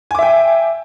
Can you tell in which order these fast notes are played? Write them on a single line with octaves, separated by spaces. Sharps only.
G#5 D6 E5 G5